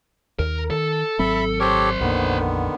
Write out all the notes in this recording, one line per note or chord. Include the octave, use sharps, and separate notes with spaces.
D#2 A#4
D#3 A4
G#1 F#3 C4 E5 B5
G4 A4 A#4 C5 C#5
A#1 F2 D3 D#3 A#3 B3